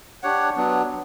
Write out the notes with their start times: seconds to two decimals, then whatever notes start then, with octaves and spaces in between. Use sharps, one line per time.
0.23 D4 G4 C#5 F#5
0.57 F#3 B3 D4